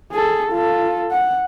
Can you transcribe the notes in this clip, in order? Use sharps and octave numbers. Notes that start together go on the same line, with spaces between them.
G#4 A4
F4 A4
F#5